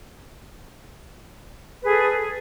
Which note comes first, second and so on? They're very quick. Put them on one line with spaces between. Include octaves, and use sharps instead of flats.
B4 G#4 A4